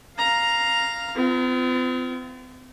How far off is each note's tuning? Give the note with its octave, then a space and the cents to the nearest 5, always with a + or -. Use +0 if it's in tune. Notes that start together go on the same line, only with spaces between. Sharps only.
F5 +0 A#5 +0
C4 -45 F4 -20